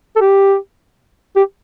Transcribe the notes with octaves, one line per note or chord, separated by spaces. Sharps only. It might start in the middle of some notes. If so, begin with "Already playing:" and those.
A4
G4
G4